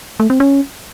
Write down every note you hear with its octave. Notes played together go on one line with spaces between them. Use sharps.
A3
C4
C#4